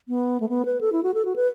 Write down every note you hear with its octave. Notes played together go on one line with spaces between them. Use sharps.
B3
A3
B3
B4
A4
E4
F#4
A4
F#4
B4